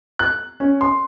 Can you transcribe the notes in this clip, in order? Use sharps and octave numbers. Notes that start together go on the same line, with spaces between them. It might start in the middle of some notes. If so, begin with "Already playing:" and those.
F#6
C#4
C6